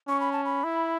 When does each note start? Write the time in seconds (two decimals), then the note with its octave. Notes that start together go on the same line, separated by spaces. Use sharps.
0.08 C#4 C#6
0.20 B5
0.32 A5
0.45 B5
0.64 E4